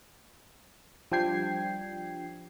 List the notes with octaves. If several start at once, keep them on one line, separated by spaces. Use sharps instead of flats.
F3 G3 D4 G5 G#6 C7